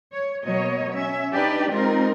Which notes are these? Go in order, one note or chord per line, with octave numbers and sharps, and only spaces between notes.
C#5
B2 F#3 A#3 C#5 D#5
C#4 E5
D4 D#4 G4 B4 D5
G#3 C4 D#4 F4 A#4